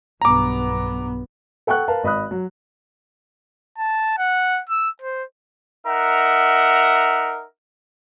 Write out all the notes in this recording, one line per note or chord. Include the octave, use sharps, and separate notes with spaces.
B1 G2 B3 A#5 D6
A4 F#5 G5 C#6 F#6
A#4 B4 F5 A5
G#1 D#5 B5 D#6 F#6
F#3
A5
F#5
E6
C5
D#4 A#4 E5 F#5